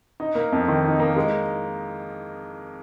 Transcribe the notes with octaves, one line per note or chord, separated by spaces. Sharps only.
D#4
A#3
F2
D#3
D#4
A#3
G#3